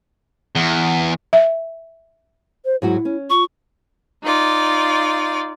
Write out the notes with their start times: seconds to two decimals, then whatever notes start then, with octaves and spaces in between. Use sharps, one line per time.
0.56 E2
1.33 E5
2.65 C5
2.82 G#2 F#3 E4 F#4
3.05 C#4
3.30 F4 C#6
4.24 D#4 F4 D5